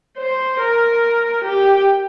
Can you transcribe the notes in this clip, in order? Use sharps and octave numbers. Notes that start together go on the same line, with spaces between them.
C5
A#4
G4